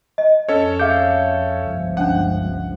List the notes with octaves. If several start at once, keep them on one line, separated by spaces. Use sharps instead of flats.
D#5
F2 C#4 A4 C#5
G#4 E5 F5 G6
G1 C#2 F3
C#4 D4 F#5